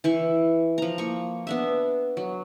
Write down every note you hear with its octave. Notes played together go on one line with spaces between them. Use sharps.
E3 E4 C#6
F3 A#5
A#3 C#6
B3 D4 E5
F#3